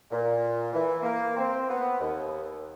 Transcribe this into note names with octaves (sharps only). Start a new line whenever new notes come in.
A#2
E3
A#3
C4
B3
D#2